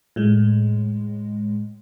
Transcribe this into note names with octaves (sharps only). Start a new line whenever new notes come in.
A2 G#3